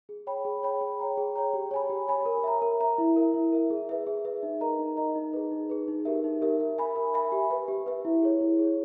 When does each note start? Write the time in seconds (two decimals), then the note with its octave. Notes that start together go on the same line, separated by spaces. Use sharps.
0.09 G#4
0.27 C#5 G5 B5
0.45 G#4
0.63 C#5 G5 B5
0.81 G#4
0.99 C#5 G5 A#5
1.17 G#4
1.36 C#5 G5 A#5
1.54 G4
1.71 C#5 G#5 B5
1.89 G4
2.08 C#5 G#5 B5
2.26 A#4
2.44 E5 A#5
2.62 A#4
2.80 E5 A#5
2.98 E4
3.16 A#4 E5
3.34 E4
3.53 A#4 E5
3.70 G#4
3.89 B4 E5
4.07 G#4
4.25 B4 E5
4.43 D#4
4.61 A#4 D#5 A#5
4.79 D#4
4.97 A#4 D#5 A#5
5.16 D#4
5.33 G#4 B4
5.51 D#4
5.70 G#4 B4
5.88 D#4
6.05 G4 A#4 E5
6.24 D#4
6.41 G4 A#4 E5
6.60 A#4
6.78 E5 G#5 B5
6.96 A#4
7.14 E5 G#5 B5
7.32 G4
7.50 B4 E5
7.68 G4
7.86 B4 E5
8.05 E4
8.23 G#4 C#5
8.41 E4
8.59 G#4 C#5